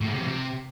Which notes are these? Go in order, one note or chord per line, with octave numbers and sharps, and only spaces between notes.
A2
G#2
C3
E2
C3